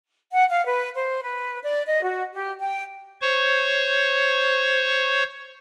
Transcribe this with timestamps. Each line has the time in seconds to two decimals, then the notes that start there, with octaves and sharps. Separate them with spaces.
0.32 F#5
0.50 F5
0.66 B4
0.95 C5
1.23 B4
1.63 D5
1.87 D#5
2.02 F#4
2.34 G4
2.60 G5
3.21 C5 C#5 C#6